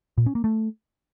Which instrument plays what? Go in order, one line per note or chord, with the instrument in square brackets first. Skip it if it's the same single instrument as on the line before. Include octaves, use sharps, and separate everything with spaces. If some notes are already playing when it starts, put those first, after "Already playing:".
[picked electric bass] A#2
C#4
A#3
A3